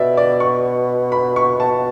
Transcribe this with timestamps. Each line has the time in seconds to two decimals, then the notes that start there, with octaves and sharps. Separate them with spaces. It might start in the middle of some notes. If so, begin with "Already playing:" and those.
Already playing: B2 D5 E5
0.17 D5
0.40 C#6
1.12 B5
1.36 C#6
1.60 A5